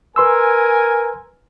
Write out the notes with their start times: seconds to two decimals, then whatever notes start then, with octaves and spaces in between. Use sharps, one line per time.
0.16 A#4 B4 G#5 C6 E6